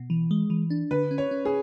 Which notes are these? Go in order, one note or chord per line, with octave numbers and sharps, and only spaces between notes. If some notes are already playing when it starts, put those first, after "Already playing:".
Already playing: B2
E3
G#3
E3
D4
D3 B4
C#4
C#5
C#4
G#4